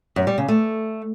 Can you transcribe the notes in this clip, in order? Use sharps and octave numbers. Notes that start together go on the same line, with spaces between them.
F#2
G3
C#3
A3